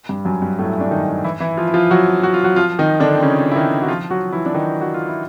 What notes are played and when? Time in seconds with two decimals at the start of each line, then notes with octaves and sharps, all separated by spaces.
0.09 G2 G3
0.25 F#2 F#3
0.42 G2 G3
0.59 A2 A3
0.80 D4
0.91 D#3 D#4
1.24 E3 E4
1.40 E3 E4
1.57 F3 F4
1.68 E4
1.74 F3 F4
1.91 F#3 F#4
2.23 F#4
2.34 F4
2.44 F#3 F#4
2.56 F3 F4
2.79 D#3 D#4
3.00 D3 D4
3.15 C4
3.23 C#3 C#4
3.51 E4
3.56 D#3 D#4
3.82 F#4
3.88 F3 F4
4.10 F#3 F#4
4.33 E3 E4
4.46 D4
4.54 D#3 D#4
4.81 F#4
4.94 F4
5.08 E4